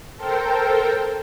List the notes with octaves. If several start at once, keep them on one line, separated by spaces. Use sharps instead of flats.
A4 A#4 C5 G5